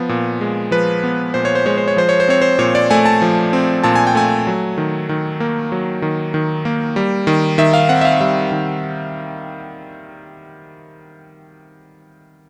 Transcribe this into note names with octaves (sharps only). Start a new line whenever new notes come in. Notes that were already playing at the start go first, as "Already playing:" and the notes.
Already playing: F3 B3
A#2
G#3
F3 B4
B3
A#2 C5
C#5
C5
G#3 C#5
C5
C#5
F3 C5
C#5
C5
C4 C#5
C5
A#2 C#5
D5
A3 G#5
A5
F3
C4
A#2 A5
G#5
G5
A3 G#5
F#3
D#3
D#3
A#3
F#3
D#3
D#3
A#3
G3
D#3
D#3 E5
F5
C4 F#5
E5
F5
G3 E5
D#3